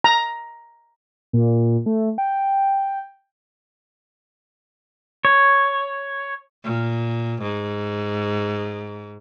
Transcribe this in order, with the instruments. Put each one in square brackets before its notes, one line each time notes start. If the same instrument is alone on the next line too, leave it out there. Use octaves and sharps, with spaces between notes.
[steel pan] A#5
[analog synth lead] A#2
A3
G5
[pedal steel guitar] C#5
[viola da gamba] A#2
G#2